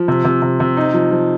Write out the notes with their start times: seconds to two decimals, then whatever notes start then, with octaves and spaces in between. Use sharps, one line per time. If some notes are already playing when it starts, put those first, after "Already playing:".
Already playing: F3
0.08 C3
0.24 C3
0.42 C3
0.60 C3
0.77 D#4
0.93 F3
1.11 F3